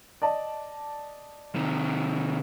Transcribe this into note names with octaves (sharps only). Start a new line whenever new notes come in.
D5 D#5 A5
C3 D#3